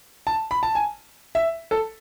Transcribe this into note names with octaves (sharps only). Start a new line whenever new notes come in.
A5
B5
A5
G#5
E5
A4